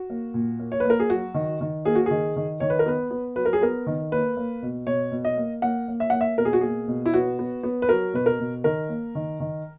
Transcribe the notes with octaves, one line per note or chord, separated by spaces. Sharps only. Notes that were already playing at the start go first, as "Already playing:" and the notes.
Already playing: F#4
A#3
A#2
A#3
C#5
A#3 B4
A#4
G#4
F#3 F#4
D#3
D#3
A#3 G#4
F#4
D#3 G#4
D#3
D#3 C#5
B4
A#4
B3 B4
B3
F#3 B4
A#4
G#4
B3 A#4
D#3
A#3 B4
A#3
B2
B2 C#5
B2
D#5
A#3
A#3 F#5
A#3
E5
A#3 F#5
E5
B2 A#4
G#4
F#4
A#3 G#4
B2
E4
B3 F#4
B3
B3
B4
F#3 A#4
B2 B4
A#4
B2
D#3 A#4
A#3
D#3
D#3